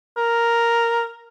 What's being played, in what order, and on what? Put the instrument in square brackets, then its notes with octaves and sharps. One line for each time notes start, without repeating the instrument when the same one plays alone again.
[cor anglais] A#4